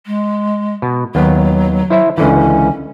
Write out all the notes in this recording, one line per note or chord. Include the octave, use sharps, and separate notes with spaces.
G#3
B2
D#2 F#3 B3
E4 C5 E5
C#2 D3 E3 C#4